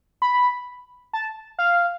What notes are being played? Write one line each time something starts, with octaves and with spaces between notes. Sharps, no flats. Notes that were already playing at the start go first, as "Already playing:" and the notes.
B5
A5
F5